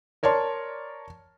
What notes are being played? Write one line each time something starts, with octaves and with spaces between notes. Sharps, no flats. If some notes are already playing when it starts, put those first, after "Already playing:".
A#4 C#5 D5 A5 C6